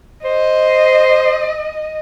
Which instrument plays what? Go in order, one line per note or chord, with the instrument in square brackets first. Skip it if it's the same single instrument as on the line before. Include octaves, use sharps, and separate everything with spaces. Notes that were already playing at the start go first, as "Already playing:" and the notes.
[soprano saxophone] C5 [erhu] D#5